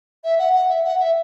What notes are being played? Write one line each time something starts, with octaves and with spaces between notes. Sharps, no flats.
E5
F#5
F#5
E5
F#5
E5